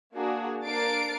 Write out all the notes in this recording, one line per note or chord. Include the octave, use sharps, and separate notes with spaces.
A#3 D4 F#4 G#4
A#3 D4 A#4 A6 C7 D7